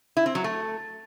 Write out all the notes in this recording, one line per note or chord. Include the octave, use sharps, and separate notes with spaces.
E4
C4
F#3
A3